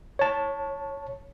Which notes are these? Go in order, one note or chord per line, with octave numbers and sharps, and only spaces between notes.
C#5 A5